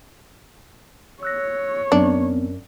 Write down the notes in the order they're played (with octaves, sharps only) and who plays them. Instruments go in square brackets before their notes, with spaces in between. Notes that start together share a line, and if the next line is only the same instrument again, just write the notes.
[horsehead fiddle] C#5 [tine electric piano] E6 F#6 A#6
[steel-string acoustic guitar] F#2 [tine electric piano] B3 C4 [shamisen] D4